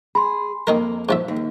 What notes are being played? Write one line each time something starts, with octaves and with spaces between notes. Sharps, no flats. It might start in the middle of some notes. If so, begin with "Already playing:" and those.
G#4 B5 C6
F2 D#3 A#3 D#4 A#4
G#2 F3 E5
D#2